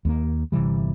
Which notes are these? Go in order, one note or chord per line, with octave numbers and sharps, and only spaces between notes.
D#2 G#3 A#3
G1 C3 E3 G3